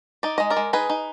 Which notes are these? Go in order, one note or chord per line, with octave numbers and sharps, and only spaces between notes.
D#4 D5
G#3 D#5
A#4 D5
G#3
D#4 G#4 B4
D#4